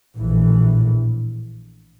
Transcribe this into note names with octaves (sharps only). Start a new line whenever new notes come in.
A#1 A2 E3